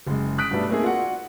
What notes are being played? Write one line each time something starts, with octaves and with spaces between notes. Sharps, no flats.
F#1 G#3
D#6 F#6 B6 D7
G2 B2 G3 A3 B3 D4
A3 A#3 C4 D#4 G#4
F4 F#4 D5 F#5